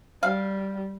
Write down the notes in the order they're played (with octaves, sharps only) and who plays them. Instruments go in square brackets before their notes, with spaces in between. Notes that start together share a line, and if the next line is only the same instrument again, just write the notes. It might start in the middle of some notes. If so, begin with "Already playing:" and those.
[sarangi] G3 [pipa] F5